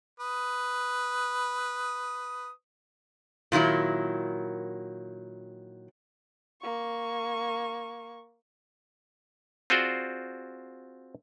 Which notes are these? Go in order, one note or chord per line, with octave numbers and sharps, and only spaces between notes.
B4 D#6
A#2 D#3 F#3 E4
A#3 C#6
C4 F4 F#4 G#4 C5 D5